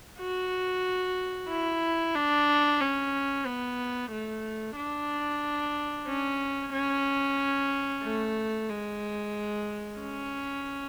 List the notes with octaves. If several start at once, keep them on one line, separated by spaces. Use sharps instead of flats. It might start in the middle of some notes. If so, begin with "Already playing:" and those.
F#4
E4
D4
C#4
B3
A3
D4
C#4
C#4
A3
G#3
C#4